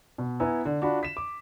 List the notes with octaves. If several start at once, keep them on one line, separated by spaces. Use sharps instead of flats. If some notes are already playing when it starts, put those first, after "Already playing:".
B2
B3 E4 G#5 A#5 E6
D3
D4 F4 F#4 B5
B6 E7
D6